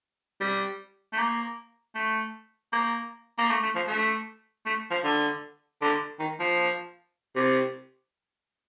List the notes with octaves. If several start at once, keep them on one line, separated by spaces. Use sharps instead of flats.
G3
A3
A#3
A3
A#3
A#3
A3
A3
F3
A3
A3
F3
D3
D3
D#3
F3
C3